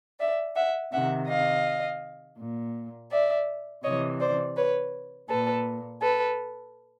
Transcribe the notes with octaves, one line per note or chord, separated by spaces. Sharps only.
D5 E5
E5 F#5
C3 D#3 E5 F#5
D#5 F5
A#2
D5 E5
C3 E3 C#5 D#5
C5 D5
B4 C#5
A#2 A4 B4
A4 B4